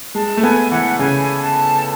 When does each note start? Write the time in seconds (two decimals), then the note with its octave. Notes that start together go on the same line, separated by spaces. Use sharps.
0.15 G#3 A5
0.37 A3
0.43 B3 G#5
0.71 E3 F#5
0.90 F#5
0.99 C#3 G#5
1.37 G#5
1.41 A5